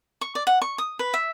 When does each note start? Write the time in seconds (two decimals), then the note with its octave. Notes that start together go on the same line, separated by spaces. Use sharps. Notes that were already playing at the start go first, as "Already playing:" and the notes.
0.21 C#6
0.35 D5
0.47 F#5
0.62 C#6
0.78 D#6
0.99 B4
1.14 E5